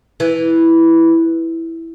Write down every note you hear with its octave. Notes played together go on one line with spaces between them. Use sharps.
E3